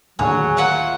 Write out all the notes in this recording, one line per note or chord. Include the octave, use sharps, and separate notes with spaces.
D#2 A2 D3 F#3 G#4 C#5
A#3 F4 E5 F#5